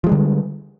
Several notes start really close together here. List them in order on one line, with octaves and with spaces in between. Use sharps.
F3 G#3 G3 D3